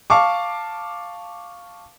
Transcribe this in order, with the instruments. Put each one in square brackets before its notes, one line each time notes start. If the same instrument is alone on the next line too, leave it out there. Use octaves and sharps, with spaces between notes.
[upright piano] F5 A5 C#6 D6